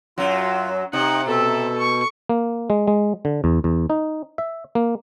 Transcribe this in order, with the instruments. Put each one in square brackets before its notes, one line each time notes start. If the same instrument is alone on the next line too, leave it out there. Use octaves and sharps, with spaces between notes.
[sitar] F#2 F#3 [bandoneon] F4
[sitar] C3 [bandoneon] D#4 [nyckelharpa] F#5
[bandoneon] B2 [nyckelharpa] A4 E5
[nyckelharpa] C#6
[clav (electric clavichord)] A#3
G#3
G#3
D3
E2
E2
D#4
E5
A#3